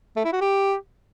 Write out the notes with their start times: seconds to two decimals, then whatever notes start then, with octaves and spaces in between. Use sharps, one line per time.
0.16 A3
0.25 E4
0.33 F#4
0.41 G4